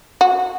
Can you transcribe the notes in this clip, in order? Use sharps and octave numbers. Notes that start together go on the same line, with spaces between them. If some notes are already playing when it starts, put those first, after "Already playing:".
F#4